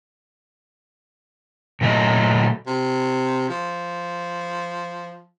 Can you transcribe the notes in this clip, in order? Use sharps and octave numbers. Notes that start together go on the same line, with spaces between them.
A#2 F#3 A3 C5 D#5
C3
F3